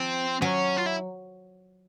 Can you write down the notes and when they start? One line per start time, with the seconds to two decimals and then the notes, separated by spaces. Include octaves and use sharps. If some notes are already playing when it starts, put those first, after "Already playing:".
Already playing: F3 C4
0.42 F#3 C#4
0.77 F4
0.87 E4